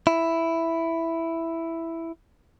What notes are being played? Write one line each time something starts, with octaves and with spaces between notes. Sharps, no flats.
E4